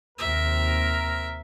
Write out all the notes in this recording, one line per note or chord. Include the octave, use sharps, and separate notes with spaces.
D#2 C3 C4 A#4 E5